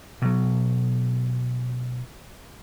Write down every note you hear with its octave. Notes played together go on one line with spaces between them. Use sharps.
B2 F#3